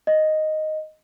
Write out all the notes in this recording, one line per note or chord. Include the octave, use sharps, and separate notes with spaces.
D#5